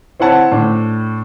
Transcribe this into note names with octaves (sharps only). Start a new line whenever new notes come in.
C4 E4 C#5 F#5 A5
A2 D4